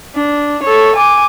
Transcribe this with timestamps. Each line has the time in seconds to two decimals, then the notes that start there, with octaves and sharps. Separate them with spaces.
0.15 D4
0.63 A4 C#5
0.96 G#5 D6